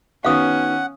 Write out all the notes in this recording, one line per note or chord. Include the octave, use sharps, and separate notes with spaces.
D#3 B3 C#4 F#4 F5 F#5 D#6